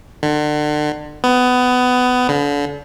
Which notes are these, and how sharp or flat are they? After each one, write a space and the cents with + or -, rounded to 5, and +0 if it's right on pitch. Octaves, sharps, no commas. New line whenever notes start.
D3 +35
B3 +20
D3 -35